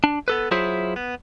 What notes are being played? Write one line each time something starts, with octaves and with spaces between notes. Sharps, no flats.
D4
B3 A4 B4
F#3 E4 F4 G#4 C5 E5
B3